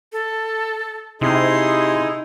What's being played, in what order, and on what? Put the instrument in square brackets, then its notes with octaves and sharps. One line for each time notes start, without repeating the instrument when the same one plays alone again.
[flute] A4
[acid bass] C3 [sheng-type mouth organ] D#4 E4 G#4 [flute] C6